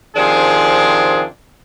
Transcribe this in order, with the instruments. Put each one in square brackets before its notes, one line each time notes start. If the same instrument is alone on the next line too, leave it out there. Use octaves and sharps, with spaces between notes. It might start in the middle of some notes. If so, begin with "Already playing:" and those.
[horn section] C3 D#3 F3 D4 G#4